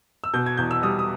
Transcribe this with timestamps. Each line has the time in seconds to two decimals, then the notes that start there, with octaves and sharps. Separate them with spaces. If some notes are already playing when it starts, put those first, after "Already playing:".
0.24 E6
0.33 B2 G6
0.46 G#6
0.57 E2 G6
0.71 E6
0.83 G3 D#6
0.99 D#6